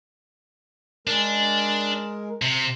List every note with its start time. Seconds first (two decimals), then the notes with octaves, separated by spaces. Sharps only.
1.07 G#3 D4 A#4
2.42 C3